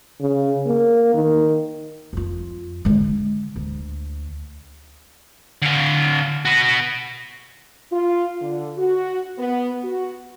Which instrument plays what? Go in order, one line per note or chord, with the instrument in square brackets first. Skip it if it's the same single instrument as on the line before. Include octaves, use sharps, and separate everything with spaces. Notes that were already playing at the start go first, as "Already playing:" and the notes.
[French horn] C#3
A#3
D#3
[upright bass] F2 F4
D3 G#3
D2
[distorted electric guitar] D3 F5
F#4 B4
[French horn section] F4
D3
F#4
B3
F#4